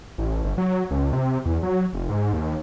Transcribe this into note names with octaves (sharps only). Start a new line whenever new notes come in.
A1
G1
F#3
C#2
C3
E2
F#3
F1
G#2
D#2